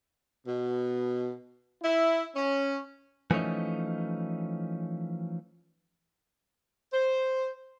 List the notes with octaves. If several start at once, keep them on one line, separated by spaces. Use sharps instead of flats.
B2
E4
C#4
E3 F3 A3 C#4 D#4
C5